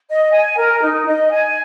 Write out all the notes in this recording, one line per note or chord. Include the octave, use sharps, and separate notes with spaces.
D#5
G#5
A#4
D#4
D#5
G#5